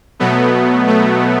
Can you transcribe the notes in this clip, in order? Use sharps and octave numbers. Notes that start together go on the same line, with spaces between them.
B2 F#3 A3 B3
A3